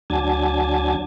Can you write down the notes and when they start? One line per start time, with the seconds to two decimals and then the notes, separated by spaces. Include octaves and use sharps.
0.10 D2 F#3 D4 G#5 A5